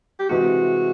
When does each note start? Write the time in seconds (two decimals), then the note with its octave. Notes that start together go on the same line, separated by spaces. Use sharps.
0.20 G4
0.29 C3 E3 G#3 C4 F#4